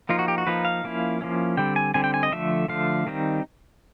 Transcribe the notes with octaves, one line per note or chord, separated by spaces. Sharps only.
F3 A#3 D#4 F4
F#4
G4
F#4
F3 A#3 D#4 B4
F5
F3 A#3 C#4 E4
F3 A#3 C#4 E4
D3 G3 C4 G5
G#5
D3 G3 C4 G#5
G5
G#5
D#5
D3 F3 A3 E5
D3 F3 A3 F5
D#3 G3 C4 D#4